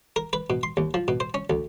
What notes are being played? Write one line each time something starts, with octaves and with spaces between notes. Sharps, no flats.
A#4
B4
B2
C6
D#2
F3
B2
C5
C#4
D2